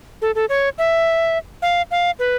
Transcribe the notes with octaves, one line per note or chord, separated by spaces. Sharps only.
A4
A4
C#5
E5
F5
F5
B4